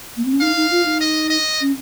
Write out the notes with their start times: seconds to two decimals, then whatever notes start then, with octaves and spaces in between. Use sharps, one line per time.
0.17 A#3
0.25 C4
0.33 C#4
0.41 D#4 F5
0.56 D#4
0.71 F4
0.85 D#4
1.01 D#5
1.30 D#5
1.61 C#4